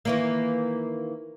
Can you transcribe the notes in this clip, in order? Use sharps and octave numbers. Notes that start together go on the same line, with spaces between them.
D#3 E3 A#3